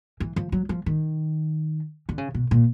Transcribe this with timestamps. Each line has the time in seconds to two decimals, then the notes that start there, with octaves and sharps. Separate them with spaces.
0.20 E3
0.36 F3
0.52 F#3
0.69 F3
0.86 D#3
2.09 D3
2.18 C#3
2.34 B2
2.51 A#2